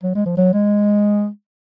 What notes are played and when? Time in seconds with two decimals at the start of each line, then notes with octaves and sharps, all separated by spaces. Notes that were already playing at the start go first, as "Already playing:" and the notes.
0.03 F#3
0.15 G#3
0.26 F3
0.37 F#3
0.54 G#3